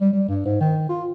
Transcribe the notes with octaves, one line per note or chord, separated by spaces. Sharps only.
G3
G3
G2
G#2
D#3
F4